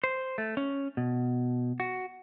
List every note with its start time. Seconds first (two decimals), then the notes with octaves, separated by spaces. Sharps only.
0.04 C5
0.38 A3
0.57 C#4
0.97 B2
1.80 F#4